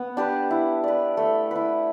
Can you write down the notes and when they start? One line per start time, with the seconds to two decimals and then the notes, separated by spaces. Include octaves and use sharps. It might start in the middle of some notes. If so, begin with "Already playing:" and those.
Already playing: B3
0.17 D4 G4 B4
0.51 E4
0.84 B4 D5
1.17 A3
1.51 E4 B4